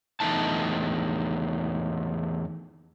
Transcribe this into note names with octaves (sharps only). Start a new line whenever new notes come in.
E2 A#2 A3 D#4 A5